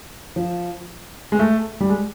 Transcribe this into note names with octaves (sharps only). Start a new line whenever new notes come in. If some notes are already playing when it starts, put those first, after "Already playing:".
F3
G#3
A3
G3
G#3